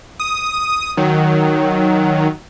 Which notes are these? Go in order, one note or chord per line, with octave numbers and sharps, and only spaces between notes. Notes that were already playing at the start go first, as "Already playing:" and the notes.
D#6
D#3 F#3